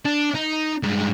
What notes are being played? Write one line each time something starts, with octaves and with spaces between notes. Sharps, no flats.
D4
D#4
G2 G#3